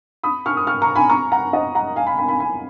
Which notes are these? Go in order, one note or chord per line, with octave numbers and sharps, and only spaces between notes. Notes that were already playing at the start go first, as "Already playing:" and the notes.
B5 D#6
C#6 F6
D#6
C#6 F6
A#5 C#6
G#5 B5
A#5 C#6
F#5 A#5
D#5 F#5
F#5 A#5
F5 G#5
G#5 B5
G#5 B5
G#5 B5
G#5 B5